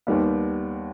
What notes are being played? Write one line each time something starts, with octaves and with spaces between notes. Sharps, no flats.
D#2 D#3 G3 B3